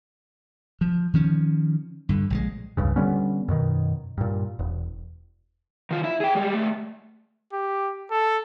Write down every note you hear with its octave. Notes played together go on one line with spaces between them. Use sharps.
F3
D#3 F3 C#4
G2 D3
A#1 D3 G#3
D#1 C#2 G2 C#3
D3 G3 B3 C#4
F#2 B2 D#3
G2 A#2
E1
D#3 F4
E4 E5
G#4 G5
G3 G#3
G3 A3
G4
A4